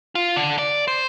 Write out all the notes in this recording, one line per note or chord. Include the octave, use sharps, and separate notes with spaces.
F4
D3
D5
C5